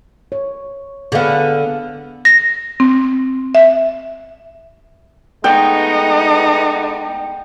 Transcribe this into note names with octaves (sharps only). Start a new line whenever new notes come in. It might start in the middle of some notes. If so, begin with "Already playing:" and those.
C#5
D3 B3 G#4 F5
A#6
C4
E5
G#3 A3 B3 D#4 G5